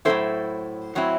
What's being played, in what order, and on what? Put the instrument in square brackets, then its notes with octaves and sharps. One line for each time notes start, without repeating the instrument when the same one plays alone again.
[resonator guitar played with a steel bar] A2 F#3 C4 E4 A4 C5
A2 F#3 C4 E4